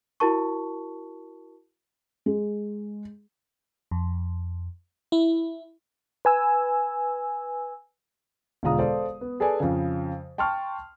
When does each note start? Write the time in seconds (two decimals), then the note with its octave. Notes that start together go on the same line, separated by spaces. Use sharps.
0.20 E4 F#4 A#4 A5 C#6
2.26 G#3
3.91 F2
5.12 E4
6.25 B4 G#5 E6
8.63 E1 D3 G#3 F4 A#5 D#6
8.79 A4 C5 D5 F5
9.21 B3
9.40 G#4 A4 B4 D5 G#5
9.60 F2 C#3
10.38 G5 A5 C6 C#6 F6